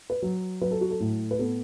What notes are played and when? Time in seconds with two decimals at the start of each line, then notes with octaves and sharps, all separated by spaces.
0.10 B4
0.22 F#3
0.61 F#3 B4
0.71 A4
0.81 F#4
0.90 A4
1.00 A2
1.31 B4
1.39 B3 A4